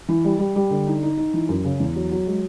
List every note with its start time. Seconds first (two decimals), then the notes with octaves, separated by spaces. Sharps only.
0.09 E3
0.24 G3
0.39 G3
0.56 G3
0.71 D3
0.87 D#4
1.03 D#4
1.17 D#4
1.34 E3
1.49 F#2
1.65 C#3
1.80 E2
1.95 F#3
2.11 F#3
2.27 G#3